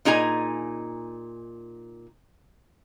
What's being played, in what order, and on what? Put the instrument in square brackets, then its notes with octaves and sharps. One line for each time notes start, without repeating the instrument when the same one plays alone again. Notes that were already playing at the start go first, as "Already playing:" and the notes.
[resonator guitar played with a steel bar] A#2 D#4 G#4 G#5 A#5